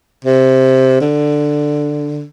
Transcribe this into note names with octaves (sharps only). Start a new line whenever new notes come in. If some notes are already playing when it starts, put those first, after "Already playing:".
C3
D3